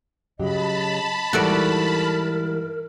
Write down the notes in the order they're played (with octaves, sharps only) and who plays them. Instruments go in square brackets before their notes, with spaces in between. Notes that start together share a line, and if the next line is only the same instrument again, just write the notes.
[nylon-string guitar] C#3 F#3 G4 [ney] D#5 [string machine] A5 B5
[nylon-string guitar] G#2 E3 G3 [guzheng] F#4 A4 D5 [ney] A#4